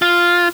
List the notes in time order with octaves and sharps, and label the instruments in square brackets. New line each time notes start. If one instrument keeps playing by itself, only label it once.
[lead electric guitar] F4